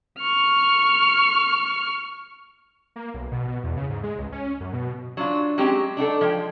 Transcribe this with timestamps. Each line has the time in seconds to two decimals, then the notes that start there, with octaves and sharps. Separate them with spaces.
0.19 C#6 F6
2.96 A#3
3.14 B1
3.32 B2
3.48 B2
3.64 E2
3.77 C#3
3.90 G#2
4.03 G#3
4.18 C#2
4.32 C#4
4.60 F#2
4.73 B2
5.17 F#3 D4 F4
5.58 F#3 G#3 C4 C#4 G4
5.97 D4 D#4 F#4 A4
6.21 F3 G#3 G5